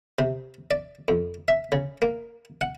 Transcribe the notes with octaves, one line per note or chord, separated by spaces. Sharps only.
C3
D5
F2
E5
C#3
A#3
F#5